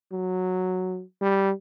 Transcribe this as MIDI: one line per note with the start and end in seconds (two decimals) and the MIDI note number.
0.12 1.02 54
1.21 1.51 55